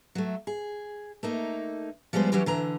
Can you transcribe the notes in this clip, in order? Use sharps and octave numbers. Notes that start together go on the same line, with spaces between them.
F#3 A3
G#4
A3 A#3 D#4
F3 G3 G#3 B3 C5
E3 F#3 C#4 F#4 G4
D3 E3 A#5